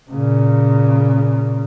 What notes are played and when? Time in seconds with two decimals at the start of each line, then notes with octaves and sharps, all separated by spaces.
0.11 A#2 C#3